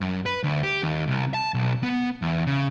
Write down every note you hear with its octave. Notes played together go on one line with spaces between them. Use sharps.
F#2
B4
D2
G4
D#2
C2
A5
B1
B3
E2
C#3